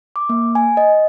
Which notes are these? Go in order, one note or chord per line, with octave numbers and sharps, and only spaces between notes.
D6
A#3
G#5
D#5